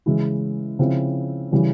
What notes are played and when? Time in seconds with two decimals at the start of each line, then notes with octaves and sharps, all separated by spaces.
0.06 C#3 E3 G#3 E4
0.79 C#3 F3 C4 E4
1.52 C#3 E3 G3